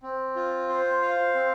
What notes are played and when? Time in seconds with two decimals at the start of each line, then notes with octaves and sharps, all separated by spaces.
0.03 C4
0.36 F4
0.69 C5
1.02 F5
1.35 C4